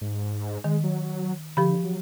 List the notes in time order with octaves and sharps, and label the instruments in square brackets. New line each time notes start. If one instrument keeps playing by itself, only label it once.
[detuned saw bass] G#2
[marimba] D#3 [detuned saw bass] G#3
[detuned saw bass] F#3
[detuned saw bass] D3 [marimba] F3 G4 B5
[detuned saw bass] F#3